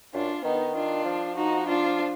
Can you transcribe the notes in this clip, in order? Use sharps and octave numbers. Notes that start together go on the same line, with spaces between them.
F#2 D4 F4
D#3 B3 D#4
D4 F4
F3
D#4 F#4
D4 F4